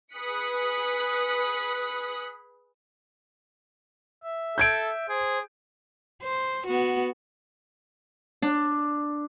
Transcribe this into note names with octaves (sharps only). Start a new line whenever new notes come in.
G#4 B4 D#6 F#6 B6 C#7
E5
A4 G6 G#6 D7
G#4 C5
C5
B3 F#4
D4